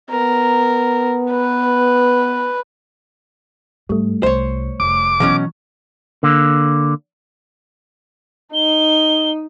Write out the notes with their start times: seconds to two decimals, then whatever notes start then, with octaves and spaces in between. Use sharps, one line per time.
0.10 B3 A#4
1.30 B4
3.89 G#2 G3 A3
4.23 C2 C5 C#5
4.80 F1 D6
5.20 B2 E3 F#3 C#4
6.23 D3 A#3
8.54 D#4 G7